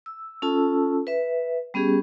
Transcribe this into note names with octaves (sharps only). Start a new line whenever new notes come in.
E6
C#4 F4 A4 A5 E6
B4 E5
G3 B3 C#4 G4 G#4